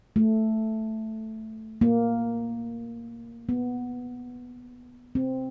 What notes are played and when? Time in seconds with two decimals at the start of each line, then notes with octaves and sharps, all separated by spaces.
0.16 A3
1.81 A#3
3.49 B3
5.15 C4